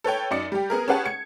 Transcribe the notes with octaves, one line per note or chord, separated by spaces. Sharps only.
A4 B4 C#5 G5
F#2 D#4 D5 C#7
G3 G4
B3 G#4 A#4
C#4 G4 G#4 B4 F#5 A5
G#6 C#7